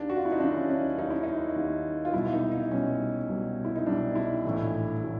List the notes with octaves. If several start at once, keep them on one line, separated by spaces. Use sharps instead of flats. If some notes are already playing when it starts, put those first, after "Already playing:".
Already playing: D#2 D#3 D4
F#4
F4
E4
D#4
D#2 D#3 D4
C#4
C#4
D#2 D#3 D#4
E4
D#4
D#2 D#3
F4
C2 B2 E4
D#4
D#4
C2 B2 C#4
C2 B2
E4
D#4
C2 B2 D4
E4
A#1 A2 E3
A2 E3